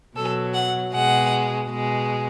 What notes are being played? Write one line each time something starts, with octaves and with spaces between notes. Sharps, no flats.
B2 F#3 A4
F#5
B2 G#3 F#5
B2 G#3